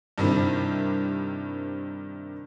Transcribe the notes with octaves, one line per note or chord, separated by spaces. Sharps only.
G2 C3 D#3 C4 E4